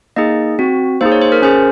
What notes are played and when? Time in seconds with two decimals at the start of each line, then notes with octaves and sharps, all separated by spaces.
0.16 A#3 D#4 G#4 D#5
0.59 C4 F#4
1.01 A#3 D#4 G#4 C5
1.12 C#5
1.21 C5
1.32 A#4
1.42 C#4 G#4 C5